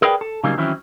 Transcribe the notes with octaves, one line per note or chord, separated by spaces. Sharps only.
G#4 A#4 B4 D5 F5 G5
A4
C#3 F#3 G3 A#3 C4 D#4
D#3 E3 F#3 C4 C#4 E4